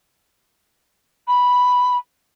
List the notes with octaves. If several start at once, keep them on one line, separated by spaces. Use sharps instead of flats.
B5